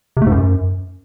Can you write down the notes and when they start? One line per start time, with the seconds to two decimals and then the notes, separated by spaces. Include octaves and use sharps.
0.17 C3
0.22 A3
0.27 G#2
0.32 F#2